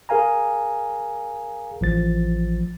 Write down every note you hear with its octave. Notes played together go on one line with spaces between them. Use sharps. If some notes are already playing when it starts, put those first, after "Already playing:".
G#4 A#4 F5 G#5 A#5
A1 F3 A6